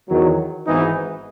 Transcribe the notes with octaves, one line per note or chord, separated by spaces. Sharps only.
E2 D#3 F#3
G#1 G#2 E3 B3 D#4